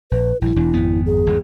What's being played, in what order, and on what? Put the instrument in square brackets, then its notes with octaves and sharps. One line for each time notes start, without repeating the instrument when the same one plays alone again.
[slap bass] A#1 [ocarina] B4
[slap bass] A#1 G2 [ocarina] E4
[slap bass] E1 E2 D4
G#1 F2 B3
[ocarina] G#4
[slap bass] G1 E2 G#2